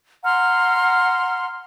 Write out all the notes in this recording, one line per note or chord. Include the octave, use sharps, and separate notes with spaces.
F#5 A#5 C6 F6